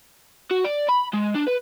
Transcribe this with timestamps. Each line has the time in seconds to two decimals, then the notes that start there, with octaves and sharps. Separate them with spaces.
0.51 F#4
0.64 D5
0.88 B5
1.13 G#3
1.34 D4
1.47 B4